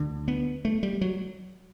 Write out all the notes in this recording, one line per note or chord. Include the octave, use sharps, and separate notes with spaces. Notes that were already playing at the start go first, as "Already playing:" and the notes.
Already playing: D2 D3
B3
A3
G3
F#3